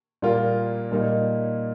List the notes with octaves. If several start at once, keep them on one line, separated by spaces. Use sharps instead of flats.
A#2 G3 A#3 F4 A#4
A#2 G3 A#3 D#4